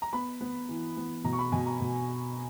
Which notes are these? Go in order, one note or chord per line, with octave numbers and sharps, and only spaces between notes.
A#5
B3 B5
B3
E3
B3
B2 A#5
C#6
B5
B2 G#5
A#5
B2